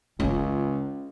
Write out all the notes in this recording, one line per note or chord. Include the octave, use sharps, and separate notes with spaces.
C#2 C#4 F4